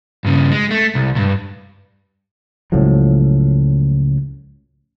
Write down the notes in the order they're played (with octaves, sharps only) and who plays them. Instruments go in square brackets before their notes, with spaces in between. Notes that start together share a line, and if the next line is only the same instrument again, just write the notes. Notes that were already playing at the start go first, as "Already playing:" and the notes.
[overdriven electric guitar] G2 C#3
G#3
A3
C2
C#2 G2
[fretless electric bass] C#2 A2 F3 F#3